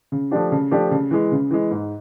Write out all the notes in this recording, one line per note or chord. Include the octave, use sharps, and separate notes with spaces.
C#3
F3 A3 D4 G4
C#3
F3 A3 D4 G4
C#3
E3 G#3
C#3
E3 G#3
G#2